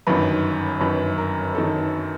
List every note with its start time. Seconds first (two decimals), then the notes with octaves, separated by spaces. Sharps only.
0.07 G1 F#2 D#3 B4
0.80 G1 F#2 D#3 B4
1.18 A#4
1.55 D#3 A4